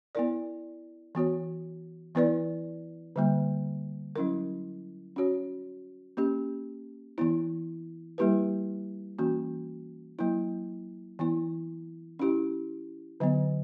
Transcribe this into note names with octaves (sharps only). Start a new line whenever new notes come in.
B3 E4 A#4 D5
E3 B3 F#4 C#5
E3 B3 E4 B4 D5
D3 G3 A#3
F#3 C#4 E4 A#4
C#4 F#4 C#5
A#3 C#4 G4
E3 B3 E4
G3 A#3 E4 G4 B4
E3 A#3 C#4 F#4
F#3 A#3 E4
E3 B3 E4
C#4 E4 G4
D3 F#3 B3